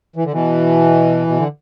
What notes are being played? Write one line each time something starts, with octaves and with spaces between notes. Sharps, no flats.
E3
D3
B2 E3
B2
D3